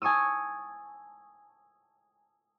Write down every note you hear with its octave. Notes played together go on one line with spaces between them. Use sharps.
G#5 A5 C#6 D#6 E6